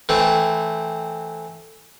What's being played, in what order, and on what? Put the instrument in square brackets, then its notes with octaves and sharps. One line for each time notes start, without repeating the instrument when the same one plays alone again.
[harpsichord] E3 A3 C4